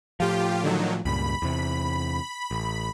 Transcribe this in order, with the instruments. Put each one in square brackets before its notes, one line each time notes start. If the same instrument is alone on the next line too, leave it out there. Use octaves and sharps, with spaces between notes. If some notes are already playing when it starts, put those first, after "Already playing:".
[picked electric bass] A2 F3 [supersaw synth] F4 G4
[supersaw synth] D3 D#3 F#3
[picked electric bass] C#2 G2 A#2 [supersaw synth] B5
[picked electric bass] E2 C3
A1